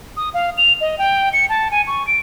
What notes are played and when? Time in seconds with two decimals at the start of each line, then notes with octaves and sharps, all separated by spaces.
0.17 D#6
0.34 F5
0.57 F7
0.81 D#5
0.99 G5
1.33 C#7
1.49 A5
1.71 G#5
1.87 C#6
2.07 D7